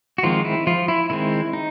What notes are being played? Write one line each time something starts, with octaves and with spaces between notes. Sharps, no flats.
F#4
D#3 F3 G#3 C4 F4
E4
F3 F4
E4
D#3 G#3 C4 E4
D#4